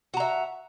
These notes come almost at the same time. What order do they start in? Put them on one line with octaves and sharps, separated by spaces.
F#4 A#5 E5